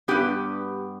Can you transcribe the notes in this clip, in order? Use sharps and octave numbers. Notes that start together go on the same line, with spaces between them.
G2 E3 B3 G4